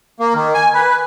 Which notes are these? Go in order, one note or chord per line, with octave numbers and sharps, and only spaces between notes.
A#3
D#3
G#5
B4